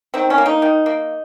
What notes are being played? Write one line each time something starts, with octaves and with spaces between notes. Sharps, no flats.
D#3 C4
C#4
A#3
D#4
D#3
A#3